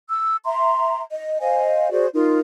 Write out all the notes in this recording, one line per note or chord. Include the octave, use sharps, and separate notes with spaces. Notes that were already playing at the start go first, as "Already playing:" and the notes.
E6
E5 A#5 C6
D#5
C5 D#5 F5 G#5
F#4 G#4 C5 D5
D#4 F4 A#4